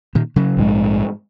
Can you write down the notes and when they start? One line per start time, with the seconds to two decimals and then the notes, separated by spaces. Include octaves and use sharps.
0.15 A#2 D#3
0.36 C#3 F#3
0.57 A#1 G#2 G#3